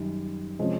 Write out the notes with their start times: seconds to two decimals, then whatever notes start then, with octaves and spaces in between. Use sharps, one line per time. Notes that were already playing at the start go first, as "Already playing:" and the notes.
Already playing: F#2 D#3 G3
0.59 C3 F3 G#3 C#4